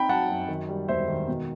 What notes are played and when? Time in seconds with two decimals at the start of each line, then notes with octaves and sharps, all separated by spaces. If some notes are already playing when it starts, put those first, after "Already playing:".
Already playing: C4 D#4 G5 B5
0.09 F#3 F#5 A5
0.29 F#2
0.48 D#3
0.69 G3
0.88 E1 C5 E5
1.08 D#3
1.28 B2